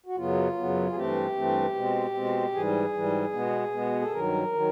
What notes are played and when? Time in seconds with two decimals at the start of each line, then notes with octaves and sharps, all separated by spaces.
0.06 F#4
0.16 F#2 C#3 F#3 B3 F4
0.56 F#2 C#3 F#3 B3
0.89 G#4
0.95 G2 E3 A3 C4 G4
1.35 G2 E3 A3 C4
1.75 B2 G#3 C4
2.14 B2 G#3 C4
2.54 G#2 E3 G3 G#4
2.93 G#2 E3 G3
3.33 B2 G#3 B3
3.72 B2 G#3 B3
4.01 A4
4.12 G2 D#3 F#3 A#4
4.53 D#3 F#3